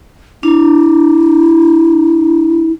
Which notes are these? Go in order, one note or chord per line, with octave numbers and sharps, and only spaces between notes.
D4 E4